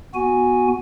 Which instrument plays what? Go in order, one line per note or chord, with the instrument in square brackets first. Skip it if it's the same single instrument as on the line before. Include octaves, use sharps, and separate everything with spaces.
[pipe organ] B3 F#4 G#5